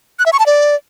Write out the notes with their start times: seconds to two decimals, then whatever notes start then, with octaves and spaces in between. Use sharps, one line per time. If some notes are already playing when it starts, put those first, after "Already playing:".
0.19 F#6
0.26 E5
0.33 C#6
0.39 A5
0.46 D5